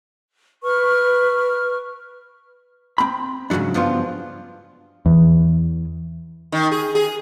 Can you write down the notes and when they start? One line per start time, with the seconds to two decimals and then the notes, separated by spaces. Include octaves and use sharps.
0.63 B4 C#6 F6
2.98 C4 B5
3.50 G#2 C#3 E3 F#3 D4
3.74 G2 F3 B3 D4 F4
5.06 E2
6.52 D#3
6.72 G#4
6.95 G#4